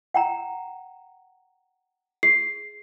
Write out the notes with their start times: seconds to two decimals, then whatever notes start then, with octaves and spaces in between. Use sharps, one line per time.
0.14 F#5 G5 A#5
2.23 G#4 C7